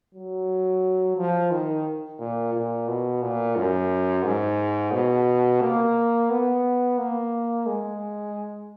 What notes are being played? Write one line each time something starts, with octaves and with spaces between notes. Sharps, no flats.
F#3
F3
D#3
A#2
A#2
B2
A#2
F#2
G#2
B2
A#3
B3
A#3
G#3